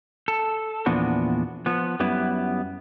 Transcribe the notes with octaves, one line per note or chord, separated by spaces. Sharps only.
A4
E2 A#2 F3 B3 D4 F#4
F3 B3
F#2 G3 B3 E4